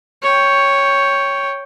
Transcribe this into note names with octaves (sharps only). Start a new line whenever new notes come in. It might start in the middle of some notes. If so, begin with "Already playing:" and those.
C#5 G5